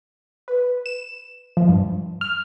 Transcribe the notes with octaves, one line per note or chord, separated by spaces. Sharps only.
B4
E7
F3
G2
F6